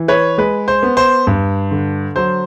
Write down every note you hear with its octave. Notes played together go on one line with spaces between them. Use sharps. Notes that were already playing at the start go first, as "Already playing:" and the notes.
Already playing: E3
B4 C#5
G#3 B4
C5
B3
C5
G2
D3
F#3 C5